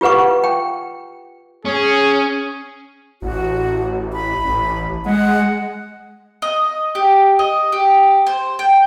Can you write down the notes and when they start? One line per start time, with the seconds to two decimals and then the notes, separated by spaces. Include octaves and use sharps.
0.01 F4 G4 B4 F#5 C#6
0.44 G5
1.65 C#4 G#4
3.22 A1 F#4
4.13 B5
4.44 A1
5.06 G#3 F#5
6.42 D#5
6.95 G4
7.39 D#5
7.72 G4
8.27 C5
8.59 G5